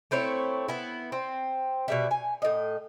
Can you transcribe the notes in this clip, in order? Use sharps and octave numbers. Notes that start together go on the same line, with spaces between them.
A3 C4 E4 C#5
B3 E4
C4
B2 G3 E4
G#5
A2 D#5